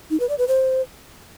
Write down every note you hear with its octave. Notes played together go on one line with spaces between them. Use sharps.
D#4
B4
D5
B4
C5